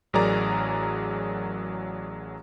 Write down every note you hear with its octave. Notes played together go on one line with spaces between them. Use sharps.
A1 F#3 G#4 A#4 D5 A#5